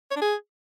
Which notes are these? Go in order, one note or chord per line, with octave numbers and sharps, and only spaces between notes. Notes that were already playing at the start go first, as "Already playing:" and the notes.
C#5
D4
G#4